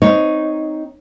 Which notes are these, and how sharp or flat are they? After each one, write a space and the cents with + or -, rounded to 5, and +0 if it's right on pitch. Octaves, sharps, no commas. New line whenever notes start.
C4 -15 D#4 +0 C#5 +0